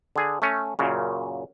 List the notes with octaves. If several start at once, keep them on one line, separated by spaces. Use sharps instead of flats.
D3 G#4
A3 C#4
F#2 A#2 C#3